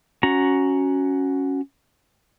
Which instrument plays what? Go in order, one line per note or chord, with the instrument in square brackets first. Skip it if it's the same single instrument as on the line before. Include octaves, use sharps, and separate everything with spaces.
[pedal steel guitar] C#4 F#4 A#5